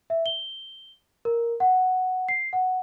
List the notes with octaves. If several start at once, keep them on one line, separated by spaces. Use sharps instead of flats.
E5
G7
A#4
F#5
C7
F#5